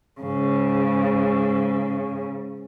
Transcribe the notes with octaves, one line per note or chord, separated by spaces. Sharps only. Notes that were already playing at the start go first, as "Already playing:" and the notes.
G#2 C#3